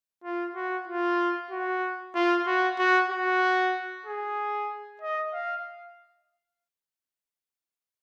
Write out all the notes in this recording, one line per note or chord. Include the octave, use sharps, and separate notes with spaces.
F4
F#4
F4
F#4
F4
F#4
F#4
F#4
G#4
D#5
F5